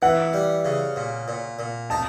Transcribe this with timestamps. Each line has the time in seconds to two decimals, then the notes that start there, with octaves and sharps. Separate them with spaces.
0.02 E3 F#5
0.33 G3
0.65 C#3
0.96 A#2
1.28 A#2
1.59 A#2
1.90 D#4 A5